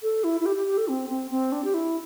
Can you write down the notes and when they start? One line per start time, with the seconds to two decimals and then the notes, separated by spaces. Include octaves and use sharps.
0.03 A4
0.24 E4
0.40 E4
0.46 G4
0.56 G4
0.67 G4
0.78 A4
0.88 C4
1.09 C4
1.31 C4
1.52 D4
1.64 G4
1.74 E4